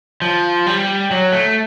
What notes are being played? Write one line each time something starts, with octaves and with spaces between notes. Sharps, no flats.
F3
G3
F#3
A3